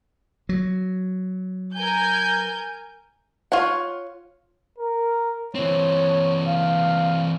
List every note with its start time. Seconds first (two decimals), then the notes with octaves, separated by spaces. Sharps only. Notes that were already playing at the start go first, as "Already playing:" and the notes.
0.49 F#3
1.76 A#4 G#5 G6
3.52 F4 C#5 F#5
4.78 A#4
5.55 E3 C4 C#5
6.48 F5